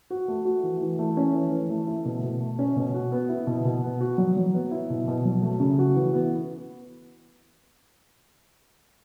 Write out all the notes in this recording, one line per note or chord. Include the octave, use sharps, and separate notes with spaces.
F#4
A3
F#4
E3
E3
A3
C#4
E3
E3
A3
E4
B2
B2
A3
C#4
B2
F#4
B3
E4
B2
B2
B3
F#4
F#3
F#3
B3
E4
B2
B2
F#3
A3
C#3
F#4
E3
B3